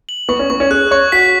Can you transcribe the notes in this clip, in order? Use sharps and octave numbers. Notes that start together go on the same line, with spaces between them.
F#7
B3 C#6
C#4
B3 C#6
C#4
G#4 F#6
C#5 C#6
F#4 B6